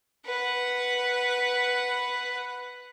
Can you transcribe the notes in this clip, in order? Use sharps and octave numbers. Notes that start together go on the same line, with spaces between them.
B4 F#5